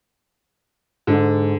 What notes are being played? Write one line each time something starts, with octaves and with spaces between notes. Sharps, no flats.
G#2 D3